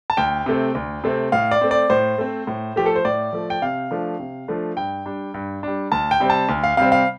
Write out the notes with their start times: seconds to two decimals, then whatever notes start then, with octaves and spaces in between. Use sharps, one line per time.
0.10 A5
0.17 D2 G5
0.46 C3 A3 C4
0.75 D2
1.04 C3 A3 C4
1.32 A2 F5
1.51 D5
1.61 A3 C4
1.71 D5
1.90 A2 C5
2.18 A3 C4
2.47 A2
2.76 F3 A3 G4
2.86 A4
2.96 C5
3.05 A2 D5
3.33 F3 A3
3.50 G5
3.62 C3 F5
3.91 F3 A3 D4
4.19 C3
4.48 F3 A3 D4
4.77 G2 G5
5.06 G3 D4
5.34 G2
5.63 G3 D4
5.92 D2 A5
6.11 G5
6.20 C3 G3 C4
6.30 A5
6.49 D2
6.64 F5
6.77 C3 G3 C4 F5
6.92 F5